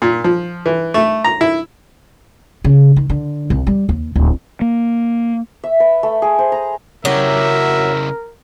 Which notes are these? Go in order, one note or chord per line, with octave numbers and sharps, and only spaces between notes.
A#2
F3
E3
A3
A#5
E4
C#3
D#3
D3
C2
G3
D#2
D1
A#3
E5
B4
A3
G#4
C5
A#5
C#3 F#3 E4 G4 A#4 E5